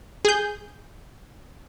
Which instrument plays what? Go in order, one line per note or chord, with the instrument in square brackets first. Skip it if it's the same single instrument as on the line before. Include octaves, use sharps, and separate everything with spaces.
[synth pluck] G#4 G6